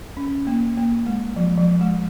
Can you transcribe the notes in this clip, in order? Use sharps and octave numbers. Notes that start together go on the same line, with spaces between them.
C#4
A#3
A#3
G#3
F3
F3
G#3